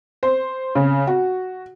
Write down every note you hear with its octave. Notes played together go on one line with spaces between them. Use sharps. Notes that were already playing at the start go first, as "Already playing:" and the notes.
C5
C#3
F#4